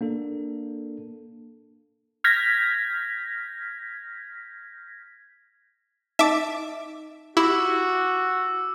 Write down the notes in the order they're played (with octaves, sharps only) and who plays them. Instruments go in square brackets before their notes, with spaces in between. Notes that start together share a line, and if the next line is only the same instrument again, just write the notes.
[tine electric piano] A#3 D4 A4
[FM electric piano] F6 G6 G#6 A#6 B6
[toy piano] D#4 D#5 [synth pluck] E5 D6
[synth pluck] E4 [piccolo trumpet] F#4 [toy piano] G4 [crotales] D6 E6